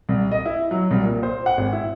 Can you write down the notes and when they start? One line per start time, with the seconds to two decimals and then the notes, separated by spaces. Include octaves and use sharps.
0.09 C2
0.32 D#5
0.46 E4
0.71 F#3
0.91 C2
1.03 A#2
1.23 C5
1.46 F#5
1.57 G#1
1.73 E4